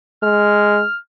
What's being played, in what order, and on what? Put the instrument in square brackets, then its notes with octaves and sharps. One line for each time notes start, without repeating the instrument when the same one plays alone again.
[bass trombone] G#3 [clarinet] F6